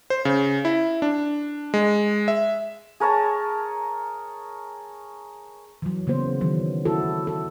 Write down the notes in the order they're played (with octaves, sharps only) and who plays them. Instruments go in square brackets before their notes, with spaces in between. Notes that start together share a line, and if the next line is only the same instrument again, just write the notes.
[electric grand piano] C5
C#3
E4
D4
G#3
E5
[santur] G#4 A#4 C#5 A5
[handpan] E3 F#3
C#3 E3 A#3 B3 C5
D#3 E3 F#3
E4 F#4 A4
A4